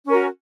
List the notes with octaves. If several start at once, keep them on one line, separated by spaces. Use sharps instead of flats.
C#4 F#4 A#4